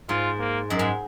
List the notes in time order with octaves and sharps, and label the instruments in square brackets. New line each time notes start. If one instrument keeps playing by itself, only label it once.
[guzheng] G#2 [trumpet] F4
[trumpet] A#3
[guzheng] F#2 [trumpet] G#3
[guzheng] G#2